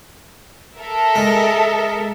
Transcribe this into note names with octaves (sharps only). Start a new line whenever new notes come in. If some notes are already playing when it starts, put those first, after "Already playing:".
A4 A#4 E5
G#3